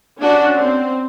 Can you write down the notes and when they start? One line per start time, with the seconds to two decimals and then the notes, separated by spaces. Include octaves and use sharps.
0.20 C#4 D4 F#4
0.56 C4